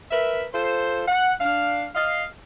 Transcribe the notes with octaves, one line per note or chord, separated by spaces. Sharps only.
A#4 B4 E5
F4 A4 C5
F#5
D4 F5
D#5 F5